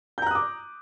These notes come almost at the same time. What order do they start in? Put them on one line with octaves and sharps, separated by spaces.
G6 A#5 F#6 D#6 D6